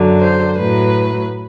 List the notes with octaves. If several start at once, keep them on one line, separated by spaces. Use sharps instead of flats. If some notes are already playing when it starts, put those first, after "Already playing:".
Already playing: F#2 D3 F#3
C5
A2 F#3 B4